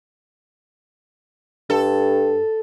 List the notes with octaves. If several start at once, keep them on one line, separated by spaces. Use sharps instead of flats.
G2 A4